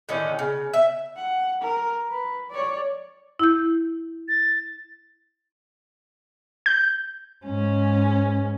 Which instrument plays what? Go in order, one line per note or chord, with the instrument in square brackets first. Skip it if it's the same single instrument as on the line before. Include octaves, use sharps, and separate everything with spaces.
[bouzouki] A2 D3 D#3 C#4
C#3
E5
[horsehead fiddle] F#5
A#4
B4
C#5 D5
[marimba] E4 G6
[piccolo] A6
[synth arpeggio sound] G6
[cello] G#2 C#4